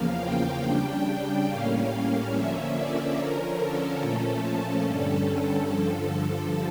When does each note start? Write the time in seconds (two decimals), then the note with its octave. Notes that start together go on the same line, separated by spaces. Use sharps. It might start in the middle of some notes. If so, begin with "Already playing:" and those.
Already playing: E2 C#3 F3 A#3 F5
0.20 G5
0.62 C#3 G3 D4
1.47 A2 G3 A#3 C#4 F5
1.90 F5
2.31 D3 F3 A#3 C#4 E5
2.75 D5
3.16 D3 F3 C#4 A#4
3.59 A4
4.01 A#2 F3 A3 C#4
4.86 G2 D3 G3 C#4 A4
5.28 A4
5.70 G2 D3 F3 A4